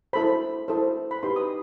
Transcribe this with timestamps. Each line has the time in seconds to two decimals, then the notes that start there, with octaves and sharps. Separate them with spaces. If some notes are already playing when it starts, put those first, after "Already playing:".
0.13 E4 A4 C5 B5
0.68 E4 A4 C5
1.11 B5
1.23 D#4 G4 B4 C6
1.36 D#6